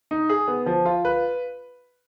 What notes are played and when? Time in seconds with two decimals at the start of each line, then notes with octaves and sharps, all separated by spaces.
0.11 D#4
0.29 G#4
0.48 B3
0.66 F3
0.85 F4
1.05 B4